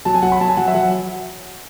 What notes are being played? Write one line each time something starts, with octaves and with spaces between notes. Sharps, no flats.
F#3 A5
G#5
F#3 F#5
B5
F#3 A5
G#5
F#3 F#5
E5
F#3 F#5